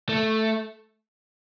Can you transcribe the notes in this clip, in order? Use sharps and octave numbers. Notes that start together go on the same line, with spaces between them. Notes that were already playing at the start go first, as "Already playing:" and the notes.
A3